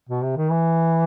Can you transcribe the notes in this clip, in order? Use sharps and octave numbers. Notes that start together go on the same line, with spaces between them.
B2
C3
D#3
E3